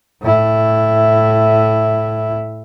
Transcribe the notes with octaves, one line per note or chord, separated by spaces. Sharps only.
A2 E4